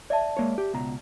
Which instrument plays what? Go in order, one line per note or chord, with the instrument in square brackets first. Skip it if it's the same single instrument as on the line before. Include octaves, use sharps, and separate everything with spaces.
[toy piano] D5 E5 A5
[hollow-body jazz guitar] G#3 A#3 C#5
G4
C#2 B2 A#5